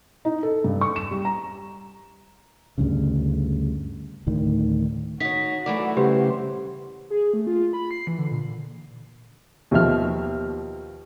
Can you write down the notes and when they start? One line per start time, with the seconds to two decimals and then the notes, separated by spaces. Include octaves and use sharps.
0.25 D#4
0.43 A4
0.64 G2
0.81 C#6
0.96 E7
1.11 G3
1.25 A#5
2.78 D2 G2 C#3
4.27 D2 A2 D#3
5.20 D#4 F#4 C#5 B6
5.66 F#2 E3 A3 D5
5.97 C#3 G3 G4 B4 C5
7.10 G#4
7.34 A3
7.47 F4
7.73 B5
7.91 C7
8.07 E3
8.18 D3
8.32 A#2
9.71 D#2 B2 F3 E5 F6